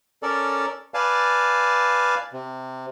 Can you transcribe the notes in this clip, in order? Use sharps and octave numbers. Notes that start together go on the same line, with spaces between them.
C#4 A4 A#4 D5
B4 D5 F5 G#5 A5
C3